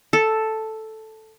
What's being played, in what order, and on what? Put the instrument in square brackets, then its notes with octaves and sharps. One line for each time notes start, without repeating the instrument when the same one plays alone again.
[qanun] A4